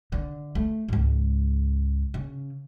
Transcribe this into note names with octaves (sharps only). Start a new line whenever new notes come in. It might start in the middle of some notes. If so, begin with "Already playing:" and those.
D3
A3
C#2 G#2
C#3